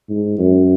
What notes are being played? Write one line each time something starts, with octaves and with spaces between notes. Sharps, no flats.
G#2
F#2